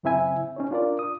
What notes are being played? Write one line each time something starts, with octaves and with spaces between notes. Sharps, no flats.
F#2 C#3 C4 E4 E5 G#5
C#4 D#4 C#5
D4 F4 A#4 D5
D#6